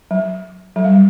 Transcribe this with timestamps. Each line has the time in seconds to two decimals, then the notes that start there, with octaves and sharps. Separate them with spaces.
0.11 F#3
0.76 F#3
0.85 G3